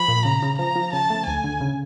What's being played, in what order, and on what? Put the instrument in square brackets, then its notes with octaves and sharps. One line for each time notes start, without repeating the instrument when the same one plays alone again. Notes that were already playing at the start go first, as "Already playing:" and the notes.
Already playing: [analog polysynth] F3 [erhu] B5
[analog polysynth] A#2
[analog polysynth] C#3 [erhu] A#5
[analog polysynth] C#3
[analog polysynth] F3 [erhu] A#5
[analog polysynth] F3
[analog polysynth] C#3 [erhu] A5
[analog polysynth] A3
[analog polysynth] D2 [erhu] G#5
[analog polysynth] D3
C#3